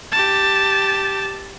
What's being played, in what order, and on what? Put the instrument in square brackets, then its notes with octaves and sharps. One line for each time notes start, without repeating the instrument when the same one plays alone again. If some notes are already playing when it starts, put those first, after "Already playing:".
[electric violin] G4 A5